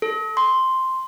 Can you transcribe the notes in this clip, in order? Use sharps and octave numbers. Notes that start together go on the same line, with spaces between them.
A4
C6